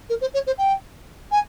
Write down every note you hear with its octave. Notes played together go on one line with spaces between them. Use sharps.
A#4
C5
C#5
C5
G5
G#5